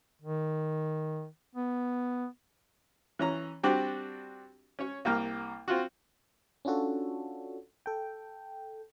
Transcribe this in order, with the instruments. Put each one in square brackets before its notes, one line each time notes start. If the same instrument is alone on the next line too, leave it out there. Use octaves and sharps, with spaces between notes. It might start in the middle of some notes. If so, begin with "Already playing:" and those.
[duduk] D#3
B3
[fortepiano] E3 C#4 A#5
G3 C4 D4 F#4
C#4 C#5
C2 A#3 G5 F6
C4 F4 F#4
[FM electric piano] C#4 D4 F4 F#4 A4
A4 G5